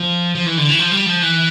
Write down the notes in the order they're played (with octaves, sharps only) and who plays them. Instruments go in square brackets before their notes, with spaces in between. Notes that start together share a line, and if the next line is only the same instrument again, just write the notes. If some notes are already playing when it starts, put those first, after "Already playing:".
Already playing: [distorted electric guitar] F3
F3
E3
D3
E3
F3
G3
F3
E3